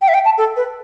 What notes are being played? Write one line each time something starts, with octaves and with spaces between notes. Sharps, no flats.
G5
E5
G5
A5
A4
B4